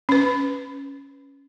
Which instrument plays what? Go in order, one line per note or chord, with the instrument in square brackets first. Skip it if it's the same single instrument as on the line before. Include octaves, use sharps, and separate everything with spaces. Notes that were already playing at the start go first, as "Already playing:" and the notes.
[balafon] C#4 B4